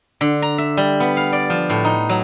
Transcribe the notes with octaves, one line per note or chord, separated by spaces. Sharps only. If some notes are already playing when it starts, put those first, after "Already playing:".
D3
A#5
E5
G3
B3
F5
D5
F3
A2
D#4
F#3